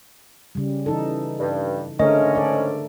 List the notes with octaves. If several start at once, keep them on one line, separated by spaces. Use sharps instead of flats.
C#3 G3
E3 D#4 A4
G2
G#2 D3 A3 C#4 A#4 D#5
A4 D5